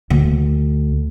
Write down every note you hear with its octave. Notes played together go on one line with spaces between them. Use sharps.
D2